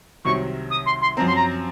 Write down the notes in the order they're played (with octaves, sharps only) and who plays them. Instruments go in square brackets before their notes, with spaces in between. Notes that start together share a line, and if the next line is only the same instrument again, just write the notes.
[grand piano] C2 C3 D#3 F#3 [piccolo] C#6
[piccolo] D#6
C6
C6
[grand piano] F#2 F3 C4 [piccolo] A#5
[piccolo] C6
A#5